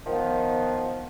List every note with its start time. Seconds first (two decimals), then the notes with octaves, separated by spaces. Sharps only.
0.06 D#3 F3 B3